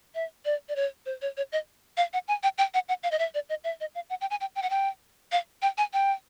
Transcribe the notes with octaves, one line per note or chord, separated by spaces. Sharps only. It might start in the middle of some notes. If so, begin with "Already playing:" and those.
E5
D5
D5
C#5
C5
C#5
C#5
D#5
F5
F#5
G#5
G5
G5
F#5
F#5
F5
D#5
E5
D5
D#5
E5
D#5
F5
F#5
G5
G#5
G5
G5
F#5
G5
F5
G5
G#5
G5